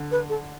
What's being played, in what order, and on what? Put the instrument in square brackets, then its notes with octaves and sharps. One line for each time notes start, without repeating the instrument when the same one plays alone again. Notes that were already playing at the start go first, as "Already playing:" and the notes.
Already playing: [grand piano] D3
[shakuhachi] B4
A4